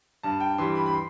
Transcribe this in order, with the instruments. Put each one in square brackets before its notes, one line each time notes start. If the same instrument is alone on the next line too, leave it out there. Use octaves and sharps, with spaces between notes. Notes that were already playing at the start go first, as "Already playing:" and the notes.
[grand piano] G2 A5
G5
E3 G3 C6
B5
B5
C6